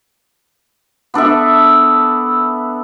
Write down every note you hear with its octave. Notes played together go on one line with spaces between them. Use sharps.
B3 D4 A4 E5